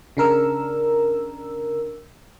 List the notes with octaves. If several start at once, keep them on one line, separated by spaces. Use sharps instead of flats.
C#3 D4 A#4 E6